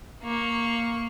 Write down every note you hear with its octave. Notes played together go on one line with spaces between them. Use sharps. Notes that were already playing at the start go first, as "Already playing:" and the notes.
A#3 C#6